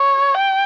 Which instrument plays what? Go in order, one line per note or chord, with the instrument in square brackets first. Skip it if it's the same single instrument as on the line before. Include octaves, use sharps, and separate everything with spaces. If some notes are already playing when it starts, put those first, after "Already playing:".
Already playing: [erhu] C#5
G5